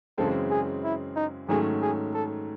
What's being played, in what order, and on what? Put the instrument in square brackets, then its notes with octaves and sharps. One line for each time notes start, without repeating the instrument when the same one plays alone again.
[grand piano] F#2 C#3 E3 G#3 C4 [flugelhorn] A4
[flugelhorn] G#4
E4
D#4
[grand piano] G#2 D#3 F#3 A3 C#4 [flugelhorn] G#4
[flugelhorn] G#4
A4